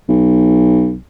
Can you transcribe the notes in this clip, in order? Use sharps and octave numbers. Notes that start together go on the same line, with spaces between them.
B1